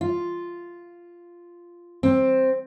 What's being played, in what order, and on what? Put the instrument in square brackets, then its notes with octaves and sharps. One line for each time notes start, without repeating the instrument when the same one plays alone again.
[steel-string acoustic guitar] F4
C4